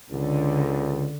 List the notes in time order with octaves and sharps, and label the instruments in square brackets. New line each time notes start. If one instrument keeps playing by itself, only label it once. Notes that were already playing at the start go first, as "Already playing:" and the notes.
[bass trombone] C#2 [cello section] D3